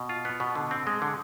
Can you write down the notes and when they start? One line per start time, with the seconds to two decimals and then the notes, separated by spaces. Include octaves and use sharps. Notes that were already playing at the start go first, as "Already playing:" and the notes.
Already playing: B2
0.09 F4
0.25 B3
0.40 B2
0.55 D3
0.71 C4
0.87 G#3
1.02 D3